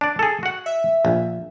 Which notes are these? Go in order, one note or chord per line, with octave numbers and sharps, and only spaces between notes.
D4 D5
G#4 A4
F#4 F#5
E5
A#1